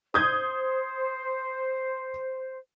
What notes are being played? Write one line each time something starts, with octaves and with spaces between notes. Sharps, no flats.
C5 D#6 G6 G#6